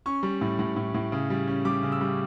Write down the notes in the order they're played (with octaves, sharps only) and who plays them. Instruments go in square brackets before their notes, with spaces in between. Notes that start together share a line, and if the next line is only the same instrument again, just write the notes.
[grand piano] C#4 C#6
G3
A2
A2
A2
A2
C#3
G3
C#4
G3 D6
C#3
E6
G3